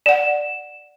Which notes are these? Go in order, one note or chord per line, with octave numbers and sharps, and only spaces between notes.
D5 F#5 E7